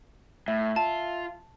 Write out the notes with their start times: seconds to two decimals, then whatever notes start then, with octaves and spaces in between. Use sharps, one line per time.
0.48 A2 E5
0.76 F4 A5